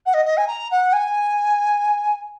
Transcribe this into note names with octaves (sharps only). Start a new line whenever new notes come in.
F#5
D#5
D#5
G#5
A#5
F#5
G#5